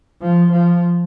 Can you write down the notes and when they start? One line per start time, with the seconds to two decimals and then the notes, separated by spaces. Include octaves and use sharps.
0.22 F3
0.52 F3